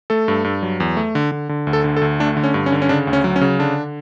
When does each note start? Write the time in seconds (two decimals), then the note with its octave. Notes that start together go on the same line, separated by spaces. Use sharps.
0.10 A3 A4
0.28 G2
0.44 G2
0.63 F#3
0.80 E2
0.97 A3
1.15 D3
1.32 D3
1.49 D3
1.67 D2
1.73 A4
1.84 D3
1.97 A4
2.02 D2
2.20 A3 D4
2.37 D3
2.44 C#4
2.54 G2
2.66 C#4
2.72 D3
2.82 C#4
2.89 C#3 D4
3.07 D2
3.13 C#4
3.24 F#3
3.36 C#4
3.41 C#3
3.59 D3 D4